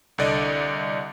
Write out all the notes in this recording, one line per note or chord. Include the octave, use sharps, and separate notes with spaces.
C2 D3 D5 D#5